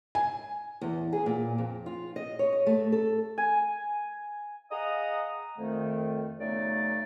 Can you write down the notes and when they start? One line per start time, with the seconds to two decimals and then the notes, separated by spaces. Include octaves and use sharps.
0.15 G#5
0.81 E2
1.13 G#4
1.26 A#2
1.58 F2
1.86 F4
2.16 D#5
2.39 C#5
2.52 D#5
2.66 A3
2.92 A4
3.38 G#5
4.70 G#4 D#5 F5 F#5 A#5 D#6
5.58 F2 D#3 A3
6.39 F#2 C#3 A3 B3 D#4 D5